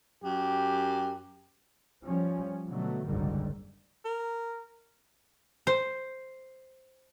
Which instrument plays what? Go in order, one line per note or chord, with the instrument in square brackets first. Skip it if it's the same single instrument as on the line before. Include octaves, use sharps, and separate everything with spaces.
[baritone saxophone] F#2 [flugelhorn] G4
[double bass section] F3 G3 C#4
B2 D3 F#3 A3
F#1 C2 G#2 D3 D#3 G3
[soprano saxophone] A#4
[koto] C5